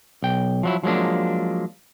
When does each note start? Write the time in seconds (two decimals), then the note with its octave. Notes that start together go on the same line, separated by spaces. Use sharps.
0.23 B1 G5
0.63 F3 F#3 E4
0.83 F3 F#3 G#3 A#3 D4